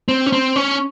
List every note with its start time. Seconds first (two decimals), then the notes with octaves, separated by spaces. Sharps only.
0.08 C4
0.26 C#4
0.32 C4
0.56 C#4